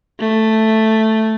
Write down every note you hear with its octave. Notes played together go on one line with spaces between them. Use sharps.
A3